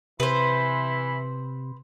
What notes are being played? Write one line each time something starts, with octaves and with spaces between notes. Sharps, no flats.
C3 E3 B4 C5 B5